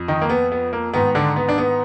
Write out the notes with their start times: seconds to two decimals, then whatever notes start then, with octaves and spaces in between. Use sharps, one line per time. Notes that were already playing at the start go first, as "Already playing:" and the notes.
Already playing: F2
0.08 D#3 D#4
0.22 A#3
0.29 B3
0.52 B3
0.73 A#3
0.94 G#2 D#3 B3
1.15 D3 D4
1.36 B3
1.49 D4
1.58 B3